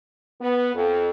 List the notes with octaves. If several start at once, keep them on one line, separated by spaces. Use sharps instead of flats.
B3
F2